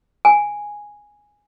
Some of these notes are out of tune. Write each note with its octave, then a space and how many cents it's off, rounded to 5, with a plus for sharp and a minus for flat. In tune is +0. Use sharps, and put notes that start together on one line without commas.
G#5 -5